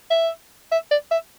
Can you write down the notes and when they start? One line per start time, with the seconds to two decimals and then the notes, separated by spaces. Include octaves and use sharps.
0.11 E5
0.72 E5
0.91 D5
1.11 E5